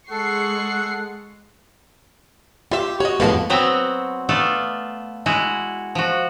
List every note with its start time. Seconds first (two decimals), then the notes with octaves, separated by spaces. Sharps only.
0.10 G#3 A4 F#5 C#6 C7
2.71 F4 G4 E5
3.00 F#4 C#5 D#5
3.20 F2 A2 G#3 A#3 B3 A5
3.50 F#3 B3 C4 F#4 E5 A#5
4.29 A3 B3 F4 A4 D5
5.26 G#3 E4 F#4
5.95 F3 F#4